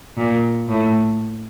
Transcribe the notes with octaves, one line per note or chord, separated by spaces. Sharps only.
A#2
A2